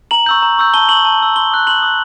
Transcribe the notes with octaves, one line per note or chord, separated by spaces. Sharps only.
A#5 F#7
C#6 E6 G6
A#5
C#6 E6 G6
A5 G7
C#6 E6 F#7
A5
C#6 E6
C6 G7
D#6 F#6
C6 F#7
D#6 F#6